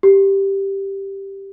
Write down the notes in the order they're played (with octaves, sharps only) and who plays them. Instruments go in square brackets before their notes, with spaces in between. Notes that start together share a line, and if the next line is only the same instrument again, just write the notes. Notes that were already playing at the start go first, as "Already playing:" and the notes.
[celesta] G4